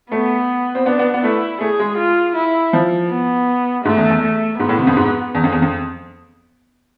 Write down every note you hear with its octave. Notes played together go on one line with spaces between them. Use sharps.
A3 B3
C4
B3 D4
B3
B3
A3 E4
A3 G#4
G#3
F4
E4
F3
B3
G#2 A3
E2
E2
A3
G#2 B3
A2
C3
F2
G#2
E2
F2
E2
F2